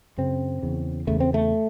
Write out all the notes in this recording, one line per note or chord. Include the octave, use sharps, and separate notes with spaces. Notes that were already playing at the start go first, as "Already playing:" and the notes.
F#2 C#3 C4
E2 C#3
E2 C#3 A3
C4
A3